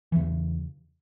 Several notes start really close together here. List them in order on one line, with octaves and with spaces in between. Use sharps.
E3 E2 C#3